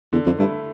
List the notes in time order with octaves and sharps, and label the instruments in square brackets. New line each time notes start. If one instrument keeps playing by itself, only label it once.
[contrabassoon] E2 [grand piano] D3
[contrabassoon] F2
[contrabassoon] G2 [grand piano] A3 E4